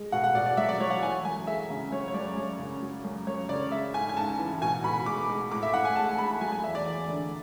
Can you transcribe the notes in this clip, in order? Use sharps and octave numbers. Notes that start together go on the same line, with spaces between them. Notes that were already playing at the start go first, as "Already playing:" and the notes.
Already playing: G#3
B2 F#5
F#5
B2 D5
D5
F#3 E5
D5
F#3 C#5
F#5
E3 G#5
F#2 G#5
G#3 E5
C#3
F#3 C#5
C#5
F#2 D5
F#2
C#3
F#3
F#2
F#2 C#5
C#3 D5
G#3 E5
G#2 G#5
G#5
G#2 A5
E3
B2 G#5
B2 B5
G#3 D6
G#3
A2 D6
E5
A2 F#5
G#5
G#3 A5
G#3 B5
F#3 G#5
G#5
E2 E5
D5
E2
D3